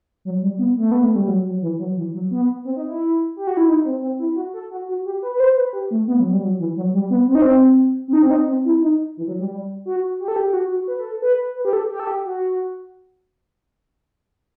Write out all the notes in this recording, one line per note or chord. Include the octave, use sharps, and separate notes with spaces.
F#3
G3
B3
A3
B3
A3
G3
F#3
F#3
E3
F#3
E3
F#3
B3
C4
D#4
E4
G4
F#4
E4
D#4
C4
C4
E4
F#4
A4
F#4
F#4
G4
B4
B4
C5
B4
G4
A3
B3
F#3
G3
F#3
E3
F#3
G3
B3
C4
D#4
C4
C4
D#4
C4
D#4
C4
E4
D#4
E3
F#3
G3
G3
F#4
G4
A4
G4
G4
F#4
F#4
B4
A4
A4
B4
B4
G4
A4
G4
A4
G4
F#4